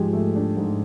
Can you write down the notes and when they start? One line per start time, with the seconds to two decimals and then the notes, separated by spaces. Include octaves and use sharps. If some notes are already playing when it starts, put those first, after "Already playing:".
Already playing: G#2 F3 G#3 G4 G#4
0.13 A3
0.35 D4
0.57 G#2